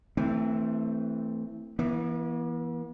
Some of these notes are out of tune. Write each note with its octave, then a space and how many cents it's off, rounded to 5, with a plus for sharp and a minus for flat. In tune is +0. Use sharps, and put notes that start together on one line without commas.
E3 -15 A3 +20 C4 +0
E3 +5 B3 -45